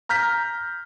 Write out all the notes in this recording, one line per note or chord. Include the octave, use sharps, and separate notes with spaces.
A#5 F6 G6 B6